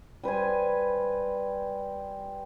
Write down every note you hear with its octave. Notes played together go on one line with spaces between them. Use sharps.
G3 B4 C5 G#5